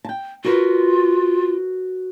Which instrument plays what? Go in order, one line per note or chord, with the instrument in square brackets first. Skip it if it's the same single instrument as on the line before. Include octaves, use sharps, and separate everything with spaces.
[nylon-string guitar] G5 A5
[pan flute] F4 [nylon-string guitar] F#4 A#4 B4